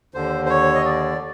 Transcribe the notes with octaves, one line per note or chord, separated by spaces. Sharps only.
D#2 D3 C5
C5
C#5
D#5
D5